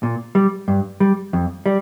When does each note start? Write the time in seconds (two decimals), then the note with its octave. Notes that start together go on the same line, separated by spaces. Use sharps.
0.03 A#2
0.35 G3
0.68 G2
1.00 G3
1.33 F2
1.66 G3